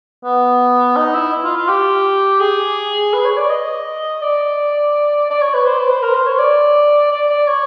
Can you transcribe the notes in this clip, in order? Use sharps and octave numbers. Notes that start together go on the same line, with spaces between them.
B3
D#4
E4
F4
F4
G4
G#4
B4
C#5
D5
D#5
D5
D5
C#5
B4
C5
B4
C5
A#4
C5
C#5
D5
D5
D5
C#5